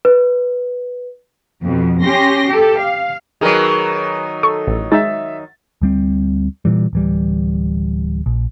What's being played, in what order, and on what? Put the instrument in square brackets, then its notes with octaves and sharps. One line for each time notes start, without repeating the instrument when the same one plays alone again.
[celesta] B4
[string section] F2 B2
C#4 G4 C6 A#6
G4 A4
F5
[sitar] D#3 F#3 [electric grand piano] G#4 A#4 B4
[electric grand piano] A4 [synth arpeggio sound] C#6
[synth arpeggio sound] A1
[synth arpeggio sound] G#3 D#4 [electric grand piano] E5 E6 A6
[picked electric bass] D2 G3 C4
A#2 E3 G3
D1 E3 G3
A#1